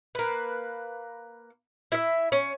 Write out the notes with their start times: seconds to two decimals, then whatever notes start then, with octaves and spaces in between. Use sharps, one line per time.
0.15 A#3 B4
1.92 E4 E5
2.32 C#4